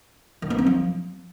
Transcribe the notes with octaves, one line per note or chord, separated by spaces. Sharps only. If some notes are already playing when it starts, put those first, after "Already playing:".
D#3
A#3
C4
F3